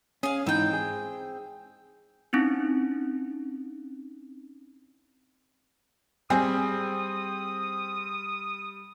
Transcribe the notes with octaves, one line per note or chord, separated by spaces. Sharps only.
C#4 G#4 F5
G#2 E3 C4 D#4 G5
G#4
C4 C#4 D#4 E4
G3 C4 G#4 D#6